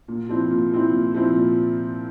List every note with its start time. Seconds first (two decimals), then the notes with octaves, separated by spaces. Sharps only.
0.08 A#2
0.29 F3 C4 E4
0.51 A#2
0.71 F3 C4 E4
0.93 A#2
1.14 F3 C4 E4
1.35 A#2